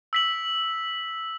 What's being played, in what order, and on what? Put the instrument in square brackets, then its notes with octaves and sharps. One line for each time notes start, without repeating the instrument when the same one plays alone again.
[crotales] E6 B6 F#7